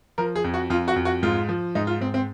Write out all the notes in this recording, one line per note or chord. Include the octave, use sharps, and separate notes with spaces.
F3 A#4
G#4
F2
F#4
F2 F4
F#4
F2
F#4
G#2 F4
F3
G#2 D#4
F4
G#2 C4
C4